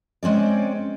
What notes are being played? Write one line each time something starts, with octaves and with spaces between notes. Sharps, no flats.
G#3 C4 C#4 D5